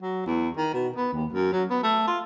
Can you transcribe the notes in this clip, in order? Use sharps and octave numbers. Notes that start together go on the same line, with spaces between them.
F#3
E2
D#3
B2
B3
D#2
F#2
F#3
B3
A3
F4